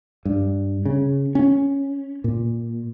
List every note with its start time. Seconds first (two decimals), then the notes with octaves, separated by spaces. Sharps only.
0.25 G2
0.85 C#3
1.35 C#4
2.24 A#2